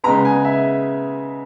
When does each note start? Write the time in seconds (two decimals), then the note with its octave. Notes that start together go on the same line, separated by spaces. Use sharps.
0.04 C#3 G#3 B3 A#5
0.25 G#5
0.45 E5